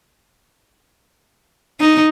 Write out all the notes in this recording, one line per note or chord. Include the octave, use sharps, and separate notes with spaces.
D#4